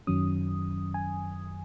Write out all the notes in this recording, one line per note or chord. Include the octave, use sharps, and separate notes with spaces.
F#2 D#3 F#3 C#4 D#6
G#5